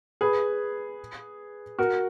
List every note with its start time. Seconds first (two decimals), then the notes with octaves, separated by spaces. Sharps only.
0.21 G#4 B4
1.79 F#4 A#4